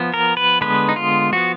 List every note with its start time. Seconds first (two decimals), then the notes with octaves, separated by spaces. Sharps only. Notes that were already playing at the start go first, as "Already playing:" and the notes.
Already playing: F3 B3
0.14 A#4
0.37 B4
0.61 D3 G#3 B3 B4
0.89 D#4
0.96 F4
1.33 F3 B3 F#4